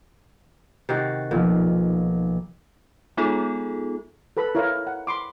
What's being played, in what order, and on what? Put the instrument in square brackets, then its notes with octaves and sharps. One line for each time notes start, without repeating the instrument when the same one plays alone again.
[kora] C3 D#3 F#4 [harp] A6 C7
[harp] B1 F3 [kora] A#2
[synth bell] G#3 B3 D#4 F4 G#4 A4
[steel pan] A4 B4 B5
E4 A#4 C#5 E5 F5
F#5
B5 C6 D6